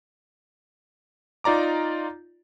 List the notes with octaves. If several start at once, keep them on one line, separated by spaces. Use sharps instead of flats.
D#4 F4 D5 A#5 D6